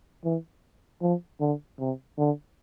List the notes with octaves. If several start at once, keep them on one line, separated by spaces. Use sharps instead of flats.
E3
F3
D3
C3
D3